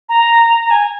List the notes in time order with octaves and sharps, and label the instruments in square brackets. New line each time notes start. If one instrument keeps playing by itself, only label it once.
[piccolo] A#5
A#5
G#5